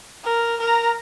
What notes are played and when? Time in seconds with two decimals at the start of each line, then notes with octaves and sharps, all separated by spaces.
0.24 A#4
0.60 A#4 A#5